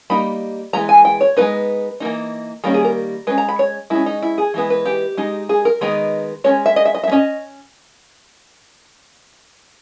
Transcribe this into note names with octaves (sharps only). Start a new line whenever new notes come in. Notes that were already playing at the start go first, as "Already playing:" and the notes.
G3 A#3 D#4 B5
E3 G#3 B3 A#5
G#5
G5
C#5
G#3 B3 D#4 B4
E3 A#3 D#4
D#3 G3 A#3 C#4 A#4
G#4
A#4
G#3 C#4 B4
A#5
B5
C#5
G#3 C#4 E4
D#4
E4
G#4
E3 G#3 B3
B4
G4
G#3 D#4
G#4
A#4
D#3 G#3 B3 D#4
G#3 C#4 C#5
E5
D#5
E5
D#5
E5
G#3
C#4 D#5